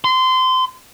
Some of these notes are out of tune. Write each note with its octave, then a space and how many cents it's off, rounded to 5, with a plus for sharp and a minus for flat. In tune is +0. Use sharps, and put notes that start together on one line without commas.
C6 -25